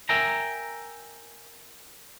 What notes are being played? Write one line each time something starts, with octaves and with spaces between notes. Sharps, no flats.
A#4 E5 G5 G#5 A#5